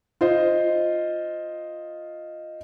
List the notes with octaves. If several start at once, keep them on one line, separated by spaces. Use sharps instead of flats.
F4 C5 D#5